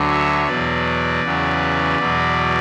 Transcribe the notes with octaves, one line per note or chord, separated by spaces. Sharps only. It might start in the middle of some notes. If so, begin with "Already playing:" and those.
Already playing: D2 D3 F#3
C#5 E5
E2 B2 F#3 B4 D5
E2 C#3 F#3
E2 B2 F#3